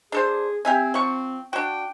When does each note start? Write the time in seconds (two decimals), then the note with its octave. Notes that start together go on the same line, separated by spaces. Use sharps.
0.12 D4 G#4 A4 C5
0.65 C4 G4 E5 G#5
0.94 F3 C#6
1.53 D4 F#4 G5